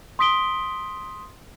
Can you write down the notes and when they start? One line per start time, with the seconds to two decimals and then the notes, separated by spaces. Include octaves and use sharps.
0.19 C6 D#6 B6 D7 G7